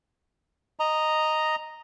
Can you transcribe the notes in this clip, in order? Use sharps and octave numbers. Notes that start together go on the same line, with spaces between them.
D#5 A#5